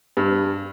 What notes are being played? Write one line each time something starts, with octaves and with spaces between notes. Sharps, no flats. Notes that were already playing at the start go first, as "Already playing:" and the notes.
G2